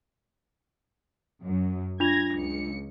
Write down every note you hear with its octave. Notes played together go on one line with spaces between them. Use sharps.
F#2
D4 F4 G#6 A#6 F7
C#2 C#7